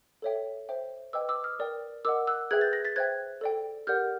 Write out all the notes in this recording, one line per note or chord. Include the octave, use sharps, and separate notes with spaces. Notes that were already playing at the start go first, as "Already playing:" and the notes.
A4 C#5 E5 G5
C5 E5 G5
B4 D#5 G5 D6 E6
D6 E6
D#6 F6
A#4 D5 G5
A#4 D#5 F#5 D6 E6
E6 F#6
G#4 B4 E5 G5 F#6 G#6
G6 A6
G#6 A#6
A6 B6
C5 E5 G5 F#6 G#6
A4 D5 G5
G4 A#4 D5 F#5 F6 G6